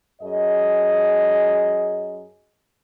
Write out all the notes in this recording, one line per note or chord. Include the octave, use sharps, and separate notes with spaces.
F#2 G#4 D#5